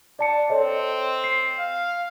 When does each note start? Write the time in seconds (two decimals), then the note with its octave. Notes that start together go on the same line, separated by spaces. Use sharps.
0.19 D4 D5 A5 C#7
0.50 C4 A4 C#5 D#5
1.24 C7
1.59 F5